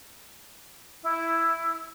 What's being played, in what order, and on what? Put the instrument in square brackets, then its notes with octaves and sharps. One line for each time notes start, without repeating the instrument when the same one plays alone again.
[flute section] E4